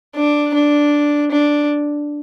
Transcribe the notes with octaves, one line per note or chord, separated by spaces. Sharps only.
D4
D4
D4